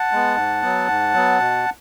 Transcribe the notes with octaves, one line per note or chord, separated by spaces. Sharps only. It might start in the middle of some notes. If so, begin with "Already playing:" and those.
Already playing: F#5 A5
G#3 B3
G#2
F#3 B3
G#2
F#3 B3
B2